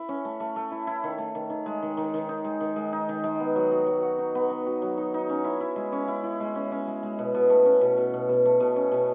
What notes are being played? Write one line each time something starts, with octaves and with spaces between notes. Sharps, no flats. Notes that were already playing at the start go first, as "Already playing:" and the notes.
Already playing: E4
C#4
A3
A3
A3
E4
E4
D#3
A3
D#3
D#3
G#3
D#3
D#3
D#3
D#4
G#3
D#3
G#3
D#4
D#3
G#3
B3
F#3
F#4
F#3
F#4
D#4
B3
D#4
F#4
F#3
D#4
D#4
C#4
E4
E4
G#3
C#4
E4
E4
G#3
C#4
C#4
G#3
G#3
B2
B2
A3
C#4
B2
B2
B2
B2
A3
B2
C#4
B2